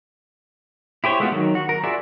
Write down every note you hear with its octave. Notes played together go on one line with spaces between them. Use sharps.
E4 G4 C5 C#5
G#3 A3 B3 F4 F#4
D#3 F#3
F#4
A#4
F4 F#4 G#4 D5 E5